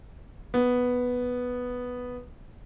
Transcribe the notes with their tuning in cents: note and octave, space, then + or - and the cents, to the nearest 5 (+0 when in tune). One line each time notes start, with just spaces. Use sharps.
B3 +0